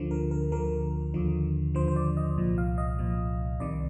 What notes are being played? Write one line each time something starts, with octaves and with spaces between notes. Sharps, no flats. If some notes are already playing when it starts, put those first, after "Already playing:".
Already playing: D2 D3 F3
A#4
A#4
D2 D3 F3 A#4
D#2 D3 F3
D#2 D3 F3 C5
C5
D5
D#5
C2 A#2 F3
F5
D#5
C2 A#2 F3
C2 C3 D#3 D5